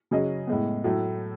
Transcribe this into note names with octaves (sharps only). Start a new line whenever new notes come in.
C#3 F#3 C#4 G#4 D#5
A2 G#3 B3
A2 F#3 A3